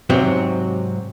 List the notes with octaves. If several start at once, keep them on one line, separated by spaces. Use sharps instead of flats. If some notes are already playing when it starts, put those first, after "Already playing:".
G#2 C3 F#3 C4 F#4